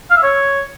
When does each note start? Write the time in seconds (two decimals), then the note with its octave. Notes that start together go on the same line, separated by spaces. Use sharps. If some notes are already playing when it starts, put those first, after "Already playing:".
0.10 F5
0.17 E5
0.23 C#5